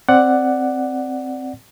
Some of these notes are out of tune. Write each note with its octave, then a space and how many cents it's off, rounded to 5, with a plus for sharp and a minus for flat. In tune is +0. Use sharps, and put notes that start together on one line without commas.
C4 +0 D5 +0 F#5 +5